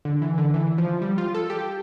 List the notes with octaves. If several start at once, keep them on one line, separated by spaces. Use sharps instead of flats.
D3
E3
D3
E3
F3
G3
F4
A4
G4